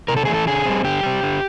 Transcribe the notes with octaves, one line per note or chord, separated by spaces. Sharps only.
C3 A#4
A4
E3 A3 G#4
A4
D3 G#4
G3 C4
D3 G4
G3 C4
D3